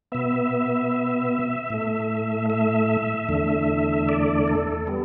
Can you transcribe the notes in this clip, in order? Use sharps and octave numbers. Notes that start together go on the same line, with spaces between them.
B2 B3 E5
A2 A3
E5
E2 D3 A3
D5
A4
G3 B3